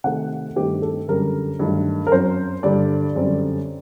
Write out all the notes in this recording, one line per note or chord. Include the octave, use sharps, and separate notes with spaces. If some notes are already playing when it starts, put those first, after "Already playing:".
C3 D#3 A3 F#5
G2 D#3 A3 C4 G4
A4
F#2 D3 G3 A#4
G2 D#3 F#3 A3
A#4
F#2 F#3 C4 C5
G2 D3 G3 D5
F#2 D3 G3 C4